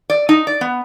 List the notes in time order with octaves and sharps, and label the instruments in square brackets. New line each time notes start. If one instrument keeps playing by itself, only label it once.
[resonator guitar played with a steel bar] D5
D#4
D5
B3